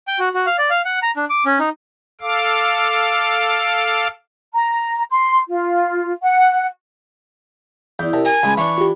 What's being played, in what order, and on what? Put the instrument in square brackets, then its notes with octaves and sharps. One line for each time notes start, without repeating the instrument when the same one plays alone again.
[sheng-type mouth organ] G5
F#4
F#4
F5
D5
F5
F#5
A#5
D4
D6
C#4
D#4
[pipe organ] A4 F5 D6
[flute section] A#5
C6
F4
F#5
[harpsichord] E2 [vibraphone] E4 D5 D#6 [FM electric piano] G6
[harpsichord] C3 [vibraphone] A#4 [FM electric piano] A5
[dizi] G#5 [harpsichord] A#5
[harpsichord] C#2 G#3 [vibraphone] B5
[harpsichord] E3 D4 [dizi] C#6
[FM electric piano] F4 G4